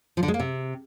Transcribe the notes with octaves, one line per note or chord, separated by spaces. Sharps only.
F3
D3
G#3
A#3
C3